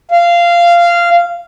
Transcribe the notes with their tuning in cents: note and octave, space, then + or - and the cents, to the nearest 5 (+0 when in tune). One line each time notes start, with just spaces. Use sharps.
F5 -15